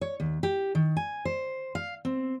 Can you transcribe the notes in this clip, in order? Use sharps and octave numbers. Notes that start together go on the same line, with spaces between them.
C#5
D#2
G4
D#3
G#5
C5
F5
C4